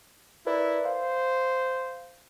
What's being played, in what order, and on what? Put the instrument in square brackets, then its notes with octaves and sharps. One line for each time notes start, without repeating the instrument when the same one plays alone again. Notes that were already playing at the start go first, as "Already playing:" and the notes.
[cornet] E4 [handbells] A#4 B4 D5
[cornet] C5 [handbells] F5